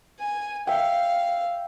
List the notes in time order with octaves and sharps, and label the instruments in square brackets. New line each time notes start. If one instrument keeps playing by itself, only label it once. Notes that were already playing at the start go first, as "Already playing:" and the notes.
[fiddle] G#5
[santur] E5 G5 [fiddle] F5